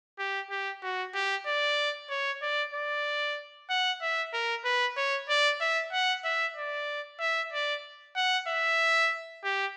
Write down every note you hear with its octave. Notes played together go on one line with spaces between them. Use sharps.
G4
G4
F#4
G4
D5
C#5
D5
D5
F#5
E5
A#4
B4
C#5
D5
E5
F#5
E5
D5
E5
D5
F#5
E5
G4